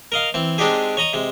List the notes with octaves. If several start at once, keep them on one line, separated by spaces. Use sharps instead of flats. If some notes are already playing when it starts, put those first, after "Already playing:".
A#4 D#5 F5
E3 C4
G#3 C4 D4 D#4 G4 G#4
C#5 D#5 A#5 D#6
C3 G#3